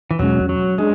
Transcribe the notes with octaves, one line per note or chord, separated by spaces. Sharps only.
E3
E2 B2 F#3 G#3 C#4
F#3
G#3 D4 G#4